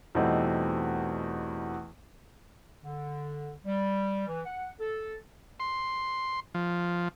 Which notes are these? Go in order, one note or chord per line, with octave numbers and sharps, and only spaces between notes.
E2 B2 G3 A3 C4 D#4
D3
G3
E3
F#5
A4
C6
F3